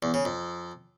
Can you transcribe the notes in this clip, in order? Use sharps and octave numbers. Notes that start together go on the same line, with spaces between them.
E2
C#3
F2